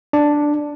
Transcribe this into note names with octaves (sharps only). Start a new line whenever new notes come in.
D4